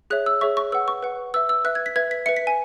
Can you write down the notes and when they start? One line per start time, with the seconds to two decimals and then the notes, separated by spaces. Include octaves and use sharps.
0.10 G#4 C#5 E5 F#6
0.26 E6
0.41 G#4 C#5 E5 C#6
0.57 C#6
0.72 B4 F#5 E6
0.88 C#6
1.03 B4 F#5
1.34 B4 E5 E6
1.49 E6
1.65 B4 E5 F#6
1.75 G#6
1.86 B6
1.96 B4 E5 G#6
2.11 B6
2.26 B4 E5 C#7
2.37 B6
2.47 G#5